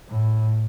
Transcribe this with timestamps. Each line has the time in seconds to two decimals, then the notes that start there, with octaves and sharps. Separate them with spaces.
0.09 A2